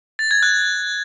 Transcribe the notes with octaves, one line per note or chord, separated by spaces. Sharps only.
A6
G#6
F#6